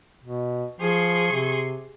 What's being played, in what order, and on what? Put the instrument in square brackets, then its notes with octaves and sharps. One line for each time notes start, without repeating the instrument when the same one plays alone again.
[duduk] B2
[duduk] F3 [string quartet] G#4 C6 C#6
[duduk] C3